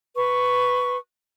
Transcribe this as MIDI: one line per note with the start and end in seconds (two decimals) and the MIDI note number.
0.15 0.97 71
0.15 0.97 85